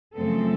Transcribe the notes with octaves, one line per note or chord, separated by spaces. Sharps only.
F#2 C#3 F3 A3 C4 A4